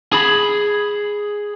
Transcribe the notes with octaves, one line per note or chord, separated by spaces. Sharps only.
G#4 B5